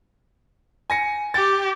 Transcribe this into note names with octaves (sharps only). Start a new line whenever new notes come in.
G#5 A#6 C#7
G4 A6